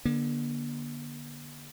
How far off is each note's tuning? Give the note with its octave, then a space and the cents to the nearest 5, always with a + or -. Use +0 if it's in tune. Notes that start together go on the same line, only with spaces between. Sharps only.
D3 +0 A#3 +45